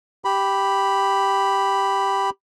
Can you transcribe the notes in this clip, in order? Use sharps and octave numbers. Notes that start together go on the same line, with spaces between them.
G4 B5